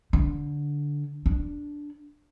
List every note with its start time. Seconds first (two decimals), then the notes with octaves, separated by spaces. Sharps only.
0.13 D3
1.26 D4